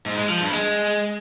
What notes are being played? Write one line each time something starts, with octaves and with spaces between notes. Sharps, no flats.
G#2
G#3
F3
G2
G#3